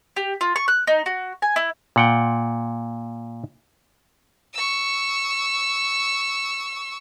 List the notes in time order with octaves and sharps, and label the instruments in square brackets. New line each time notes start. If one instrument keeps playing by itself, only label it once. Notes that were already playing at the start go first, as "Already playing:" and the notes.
[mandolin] G4
F4
C#6
F#6
D#4
F#4
G#5
E4
[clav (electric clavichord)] A#2 F#5 G5
[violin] C#6 E6